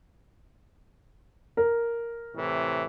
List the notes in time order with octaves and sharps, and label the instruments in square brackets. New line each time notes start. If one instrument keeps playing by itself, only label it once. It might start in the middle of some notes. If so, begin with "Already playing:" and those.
[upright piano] A#4
[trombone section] A2 C3 E3